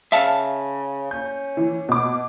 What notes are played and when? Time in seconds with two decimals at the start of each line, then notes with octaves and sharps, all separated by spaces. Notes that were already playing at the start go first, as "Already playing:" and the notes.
0.12 C#3 E5 F5 A5
1.11 C#4 G6
1.57 E3
1.89 B2 D6